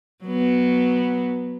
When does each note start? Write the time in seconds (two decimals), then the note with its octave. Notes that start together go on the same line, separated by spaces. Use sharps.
0.24 F#3 B3